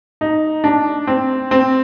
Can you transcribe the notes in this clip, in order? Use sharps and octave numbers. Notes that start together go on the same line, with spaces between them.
D#4
D4
C4
C4